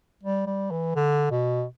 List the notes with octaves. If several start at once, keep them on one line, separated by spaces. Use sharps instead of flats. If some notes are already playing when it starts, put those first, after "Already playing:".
G3
G3
E3
D3
B2